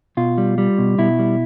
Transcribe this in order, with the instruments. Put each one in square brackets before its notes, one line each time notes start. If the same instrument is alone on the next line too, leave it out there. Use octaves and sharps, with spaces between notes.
[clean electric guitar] B2 F4
G3
G3
B2
B2 E4
G3